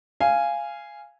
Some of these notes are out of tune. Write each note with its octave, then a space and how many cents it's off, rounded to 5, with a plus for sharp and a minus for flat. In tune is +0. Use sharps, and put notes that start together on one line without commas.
F5 -15 G#5 -5